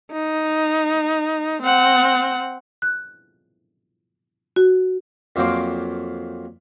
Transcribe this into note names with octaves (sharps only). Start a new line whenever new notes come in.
D#4
C4 F#5
F#6
F#4
F2 A#2 F#3 C5 F5 D6